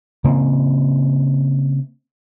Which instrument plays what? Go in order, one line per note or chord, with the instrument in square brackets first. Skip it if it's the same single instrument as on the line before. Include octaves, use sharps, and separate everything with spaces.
[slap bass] C#3 A#3 C4